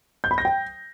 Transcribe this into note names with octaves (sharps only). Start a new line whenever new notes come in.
G6
B5
A#6
G5